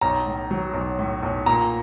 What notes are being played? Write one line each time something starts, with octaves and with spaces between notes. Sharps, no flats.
B1 A#5
A2
F#3
B1
A2
B1
A#2 A#5